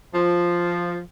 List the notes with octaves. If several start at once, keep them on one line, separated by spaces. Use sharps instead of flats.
F3